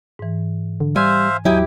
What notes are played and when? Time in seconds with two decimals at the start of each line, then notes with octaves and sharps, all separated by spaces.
0.19 G#2 E3
0.80 D3
0.96 G3 C5 E5 F5 G#5
1.45 D#2 F#3 D#4 E4 G4 G5 G#5